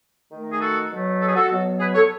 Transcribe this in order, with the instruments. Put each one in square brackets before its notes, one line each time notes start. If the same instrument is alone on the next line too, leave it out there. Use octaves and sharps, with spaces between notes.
[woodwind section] D#3 A3 D#4
G#4
F#4 A4
B2 F#3 A3
A4
G#4
F#4 A4
B2 F#3 B3
G#4 B4
A4 C#5